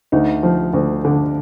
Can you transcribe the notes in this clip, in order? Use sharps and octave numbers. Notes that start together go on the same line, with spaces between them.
D2 D#4
F3
D2
D3